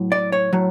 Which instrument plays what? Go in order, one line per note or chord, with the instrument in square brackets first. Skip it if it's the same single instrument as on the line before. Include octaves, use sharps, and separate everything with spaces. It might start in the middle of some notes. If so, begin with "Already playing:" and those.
Already playing: [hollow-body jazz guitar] A2 F#3
D5
C#5
A2 F#3